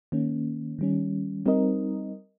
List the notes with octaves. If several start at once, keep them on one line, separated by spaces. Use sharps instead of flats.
D#3 A#3 C#4
D#3 G3 C#4
G3 C4 D#4 A#4 D#5